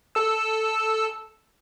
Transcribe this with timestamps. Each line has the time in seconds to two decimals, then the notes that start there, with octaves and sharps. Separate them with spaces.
0.15 A4 E6